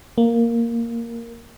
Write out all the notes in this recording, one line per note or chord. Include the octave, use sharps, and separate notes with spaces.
A#3